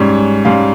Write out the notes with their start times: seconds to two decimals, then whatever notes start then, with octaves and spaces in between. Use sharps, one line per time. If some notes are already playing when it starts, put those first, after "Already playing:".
Already playing: G#2 G3 C#4 C#5
0.44 G#2 G3 C#4 F5